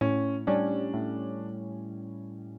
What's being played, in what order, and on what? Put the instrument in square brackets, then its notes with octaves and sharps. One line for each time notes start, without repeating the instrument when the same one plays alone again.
[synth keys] A2 [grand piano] C#4
[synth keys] G3 C#4 [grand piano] D4
[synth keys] A2